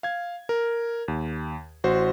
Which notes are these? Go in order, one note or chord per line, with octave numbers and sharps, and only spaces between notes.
F5 G#6
A#4
D#2
A1 F#4 C5